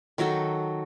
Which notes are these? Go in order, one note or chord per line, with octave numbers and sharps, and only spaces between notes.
D#3 F#3 F#4 A4